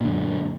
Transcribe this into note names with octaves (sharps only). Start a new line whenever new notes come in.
F#2 A#2 D3